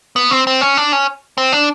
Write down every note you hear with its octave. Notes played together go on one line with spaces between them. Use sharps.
B3
C4
C4
C#4
D4
C#4
C4
D4